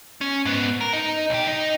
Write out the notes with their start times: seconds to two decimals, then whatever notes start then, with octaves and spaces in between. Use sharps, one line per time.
0.21 C#4
0.45 G#2 B3
0.81 A#4
0.93 D#4
1.30 B1 G4
1.47 D#4